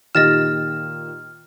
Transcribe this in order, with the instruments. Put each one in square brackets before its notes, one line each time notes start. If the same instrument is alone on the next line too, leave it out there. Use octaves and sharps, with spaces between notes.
[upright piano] A#2 D#3 G4 [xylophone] D#5 A6 E7 [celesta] F6